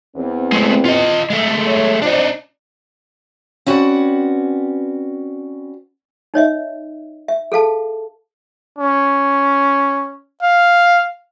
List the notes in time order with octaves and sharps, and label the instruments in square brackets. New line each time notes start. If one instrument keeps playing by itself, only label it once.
[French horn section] E2 C4
[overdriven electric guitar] G#3 A3
F4 D#5
G#3 A3
[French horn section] C#5
[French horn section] G3 F4 C5 [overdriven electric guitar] D4 D#4
[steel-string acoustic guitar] C4 C#4 F#4 B4 D5 F#5
[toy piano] D#4 C#5 D#5 E5
E5
G#4 A4 F5 A5
[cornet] C#4
F5